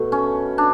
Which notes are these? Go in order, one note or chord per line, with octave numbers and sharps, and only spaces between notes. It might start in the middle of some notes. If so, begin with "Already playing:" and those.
Already playing: B2 A3
C#4
D4